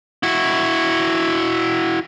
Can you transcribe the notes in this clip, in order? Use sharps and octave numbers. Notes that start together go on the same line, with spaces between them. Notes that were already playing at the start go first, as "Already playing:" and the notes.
E4 F#4